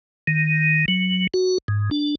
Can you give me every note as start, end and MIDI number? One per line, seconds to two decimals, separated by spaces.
0.27 0.85 51
0.88 1.27 54
1.34 1.58 66
1.68 1.90 44
1.91 2.15 62